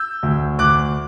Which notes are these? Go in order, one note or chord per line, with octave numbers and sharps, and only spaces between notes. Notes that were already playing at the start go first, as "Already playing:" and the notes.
Already playing: E6 G6
D2
D2 D6 F#6